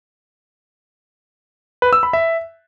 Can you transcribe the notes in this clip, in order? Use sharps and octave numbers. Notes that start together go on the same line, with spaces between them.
B4
E6
B5
E5